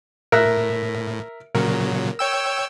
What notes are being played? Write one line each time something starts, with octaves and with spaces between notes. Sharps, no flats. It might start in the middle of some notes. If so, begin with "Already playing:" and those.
A2 A#4 E5 F#6
A#2 C#3 F#3 A#4
C#5 G5 E6